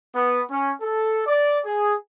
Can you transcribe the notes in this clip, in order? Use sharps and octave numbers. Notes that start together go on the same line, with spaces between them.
B3
C#4
A4
D5
G#4